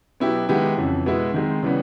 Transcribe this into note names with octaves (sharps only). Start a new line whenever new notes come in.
B2 F#3 B3 E4 G4
D#3 G#3 B3 E4 G4
F2 C#3 E3
B2 G#3 B3 E4
D#3 G#3 C4
C#3 E3 G3 B3